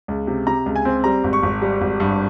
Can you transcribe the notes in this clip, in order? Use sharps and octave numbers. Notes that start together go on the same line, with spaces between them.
C#2
C3
C3 A#5
C#2
G#5
C4
G3 A#5
G#1
C#6
G#1
G3
G#1
G2